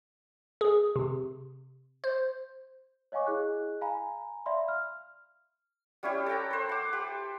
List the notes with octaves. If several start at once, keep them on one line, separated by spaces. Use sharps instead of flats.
G#4
C3
C5
C#5 D#5 F5 G#5 C#6 D6
E4 G#4 D#5 F#6
F5 G#5 A#5 B5
D5 E5 F5 B5 C6
F6
G3 C#4 E4 G4
A4 F#5 G5 A#5
B4 C5
F#5 D6
G4